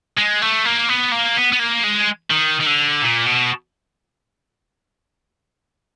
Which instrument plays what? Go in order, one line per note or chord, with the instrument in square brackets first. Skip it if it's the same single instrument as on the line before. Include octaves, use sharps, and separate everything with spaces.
[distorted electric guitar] G#3
A3
A#3
B3
A#3
B3
B3
A#3
G#3
D#3
D#3
D3
A#2
B2